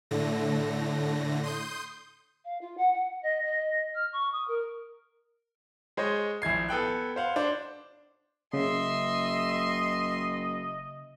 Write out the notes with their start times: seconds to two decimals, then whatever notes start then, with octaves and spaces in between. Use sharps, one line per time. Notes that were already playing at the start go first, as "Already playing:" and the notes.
0.11 A2 D3 A3 A#6
1.43 C6 D#6 G6
2.44 F5
2.61 F4
2.77 F#5
2.94 F#5
3.22 D#5
3.45 D#5
3.94 F6
4.12 C#6
4.32 D#6
4.47 A#4
5.97 G#3 C5 C#5 D#5
6.42 A#1 E4 G#6 C7
6.68 B3 A4 G5 F#6
7.16 C5 F5 F#5
7.36 D4 C5
8.53 F#1 C#3 D#5 E5 C6